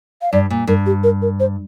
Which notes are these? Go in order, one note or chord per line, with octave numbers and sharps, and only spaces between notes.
F5
G2 D5
A#2
G2 A#4
G4
A#4
A#4
C5